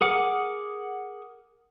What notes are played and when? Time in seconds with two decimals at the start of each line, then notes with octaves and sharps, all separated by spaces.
0.01 G#4 A#4 F#5 D6